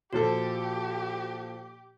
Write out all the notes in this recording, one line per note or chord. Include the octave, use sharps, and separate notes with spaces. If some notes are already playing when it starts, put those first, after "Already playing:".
A#2 F3 F#4 G4 A4